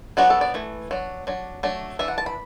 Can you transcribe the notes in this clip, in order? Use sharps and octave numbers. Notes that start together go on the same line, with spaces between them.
F#3 B3 D4 F#4
A4
D5
E3 A3
F#3 D4
F#3 D4
F#3 A3 D4
E3 D4 E5
F#5
A5
B5